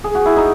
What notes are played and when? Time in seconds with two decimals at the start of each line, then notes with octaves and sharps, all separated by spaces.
0.04 G#4
0.15 F#4
0.26 E4
0.37 D#4